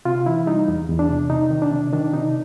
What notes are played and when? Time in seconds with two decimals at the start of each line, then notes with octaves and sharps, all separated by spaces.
0.05 C3 F4
0.26 E3 E4
0.47 G3 D#4
0.68 E2
0.89 E2
0.99 D4
1.10 C3
1.30 C3 D#4
1.51 D#3
1.62 D4
1.71 C3
1.92 D#3 D4
2.13 C3 D#4